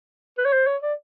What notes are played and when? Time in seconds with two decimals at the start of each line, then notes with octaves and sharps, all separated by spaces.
0.38 B4
0.45 C#5
0.53 C5
0.67 C#5
0.82 D5